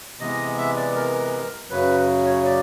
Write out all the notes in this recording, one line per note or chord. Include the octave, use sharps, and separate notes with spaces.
C3 E3 G#3 B3 D#5
E5
D5
A#4
F#2 C#3 F#3 B4
C#5
D5